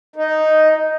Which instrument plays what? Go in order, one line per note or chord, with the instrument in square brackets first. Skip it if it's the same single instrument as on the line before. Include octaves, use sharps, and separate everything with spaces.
[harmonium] D#4